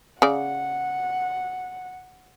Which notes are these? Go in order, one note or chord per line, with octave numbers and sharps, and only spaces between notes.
C#3 D5 F#5